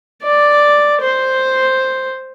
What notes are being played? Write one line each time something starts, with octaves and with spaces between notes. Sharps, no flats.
D5
C5